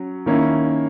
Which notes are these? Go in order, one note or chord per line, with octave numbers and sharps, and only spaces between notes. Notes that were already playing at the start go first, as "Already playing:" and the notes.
Already playing: F#3 C#4
D#3 A#3 C#4 E4